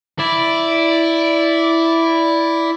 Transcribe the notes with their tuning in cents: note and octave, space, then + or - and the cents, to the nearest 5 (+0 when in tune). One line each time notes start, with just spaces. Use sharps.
E4 +0 D5 -10